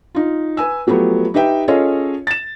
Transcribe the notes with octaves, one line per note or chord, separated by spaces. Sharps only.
D#4 F4
B4 G#5 E6
F3 F#3 A3 B3 G4
D#4 G4 B4 E5 G5
C#4 F4 G#4 A4 C#5 D#5
A6 E7